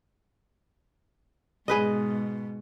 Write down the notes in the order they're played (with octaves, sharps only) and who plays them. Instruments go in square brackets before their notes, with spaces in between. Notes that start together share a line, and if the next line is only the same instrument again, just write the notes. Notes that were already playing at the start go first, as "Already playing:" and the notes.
[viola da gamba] G#2 B2 [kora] G#4 B4 D#5